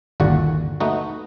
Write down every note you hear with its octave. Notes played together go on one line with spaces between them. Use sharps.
G1 D#2 A#2 D3 F#4 F#5
A3 B3 D#4 F#4